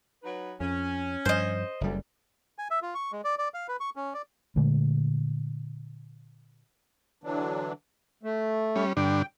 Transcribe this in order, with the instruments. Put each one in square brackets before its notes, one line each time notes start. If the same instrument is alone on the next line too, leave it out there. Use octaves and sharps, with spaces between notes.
[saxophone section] F#3 D#4 B4
[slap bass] F2 [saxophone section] C#4
[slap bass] G2 F3 [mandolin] C5 D#5
[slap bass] F#1 G3 [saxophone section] D2
[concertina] G#5
E5
F4
C#6
G#3
D5
D5
F5
B4
C#6
C#4
D5
[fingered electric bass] A#2 D3 G#3 A3
[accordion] D3 E3 F#3 D4
A3
[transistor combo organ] G3 C#4
[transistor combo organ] G2 D3 D4 [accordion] G5